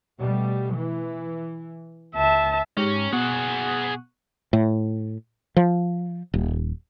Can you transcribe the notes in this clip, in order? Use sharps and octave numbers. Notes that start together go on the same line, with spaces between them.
B2 G3 A3
E3
C#2 E5 A5
G#2 C#4 G4 A#5
B2 G#4 F#5 C#6 F#6
A2
F3
D#1